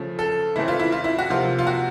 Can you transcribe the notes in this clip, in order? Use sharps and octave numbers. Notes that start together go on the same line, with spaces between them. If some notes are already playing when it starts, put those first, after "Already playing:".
Already playing: C#3 F3 A3
A4
C#3 E3 A3 C4 E4
F4
E4
F4
E4
F#4
C3 F3 A#3 F4
F4
F#4